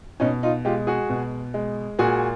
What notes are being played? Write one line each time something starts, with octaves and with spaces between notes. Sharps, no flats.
B2 C#4 D#4
D#4 F4
G#3 F4 G4
F#4 G#4
B2
G#3
A#2 F#4 G#4